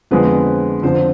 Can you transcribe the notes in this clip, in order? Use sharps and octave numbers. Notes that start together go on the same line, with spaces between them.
F2 D3 F3 G#3 B3 B4
F2 D3 F3 C5